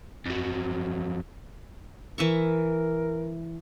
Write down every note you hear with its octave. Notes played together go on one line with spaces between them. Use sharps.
F2 F#3
E3 A#4 E5 C#6